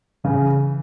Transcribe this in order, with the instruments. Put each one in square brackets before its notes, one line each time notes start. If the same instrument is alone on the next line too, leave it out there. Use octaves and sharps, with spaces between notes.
[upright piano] C#3 [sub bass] E3